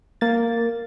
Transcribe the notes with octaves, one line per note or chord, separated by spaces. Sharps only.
A#3 A6